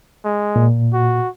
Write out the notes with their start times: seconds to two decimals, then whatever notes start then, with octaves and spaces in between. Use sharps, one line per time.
0.25 G#3
0.56 A#2
0.94 F#4